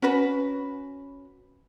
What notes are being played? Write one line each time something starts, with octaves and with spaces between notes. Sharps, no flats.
C#4 F#4 B4 B5